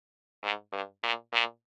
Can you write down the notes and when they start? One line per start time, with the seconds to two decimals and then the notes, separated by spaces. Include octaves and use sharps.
0.43 G#2
0.72 G2
1.03 A#2
1.33 A#2